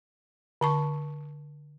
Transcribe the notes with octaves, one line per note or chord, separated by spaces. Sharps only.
D3 A5 C#6